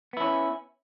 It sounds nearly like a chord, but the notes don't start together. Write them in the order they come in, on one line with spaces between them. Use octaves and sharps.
B3 E4 C#4